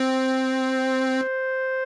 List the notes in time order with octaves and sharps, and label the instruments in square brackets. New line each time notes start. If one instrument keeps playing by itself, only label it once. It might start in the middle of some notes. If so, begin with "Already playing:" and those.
Already playing: [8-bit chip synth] C4 [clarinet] C5